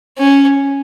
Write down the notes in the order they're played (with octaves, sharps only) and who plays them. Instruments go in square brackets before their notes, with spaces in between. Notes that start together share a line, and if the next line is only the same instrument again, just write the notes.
[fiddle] C#4